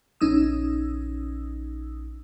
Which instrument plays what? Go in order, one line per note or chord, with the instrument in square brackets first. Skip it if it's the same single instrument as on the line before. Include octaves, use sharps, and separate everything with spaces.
[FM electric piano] A#1 C#4 D#4 D#6 E6